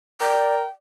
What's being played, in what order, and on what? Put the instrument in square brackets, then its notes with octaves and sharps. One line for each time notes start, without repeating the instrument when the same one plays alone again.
[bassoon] A#4 [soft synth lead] D5 [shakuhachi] G5